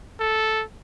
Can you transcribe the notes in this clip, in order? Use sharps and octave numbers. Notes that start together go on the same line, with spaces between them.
A4